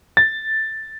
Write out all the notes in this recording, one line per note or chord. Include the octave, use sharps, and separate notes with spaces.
A6